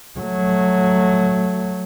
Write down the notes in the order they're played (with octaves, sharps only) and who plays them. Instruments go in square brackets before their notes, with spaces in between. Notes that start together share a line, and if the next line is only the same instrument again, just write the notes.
[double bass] F#3 A3